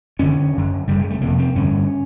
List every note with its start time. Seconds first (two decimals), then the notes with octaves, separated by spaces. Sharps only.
0.19 F#2 D3 C#4
0.53 F#2 D3
0.87 F#2 C#3 G3
0.99 G#3
1.10 A3
1.22 F2 C3 A#3
1.39 C4
1.55 G2 D3 C#4